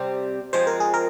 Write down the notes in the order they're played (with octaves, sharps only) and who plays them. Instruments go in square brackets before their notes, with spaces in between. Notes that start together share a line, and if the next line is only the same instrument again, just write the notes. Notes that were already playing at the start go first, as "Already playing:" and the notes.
Already playing: [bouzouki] C3 G3 C4
[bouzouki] F3 G#3 C4 F4 [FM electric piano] C5
[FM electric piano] A#4
G#4
A#4